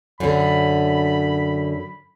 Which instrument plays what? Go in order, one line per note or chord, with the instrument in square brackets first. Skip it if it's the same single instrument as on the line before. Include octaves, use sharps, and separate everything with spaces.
[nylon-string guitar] F#2 D3 [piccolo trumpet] B5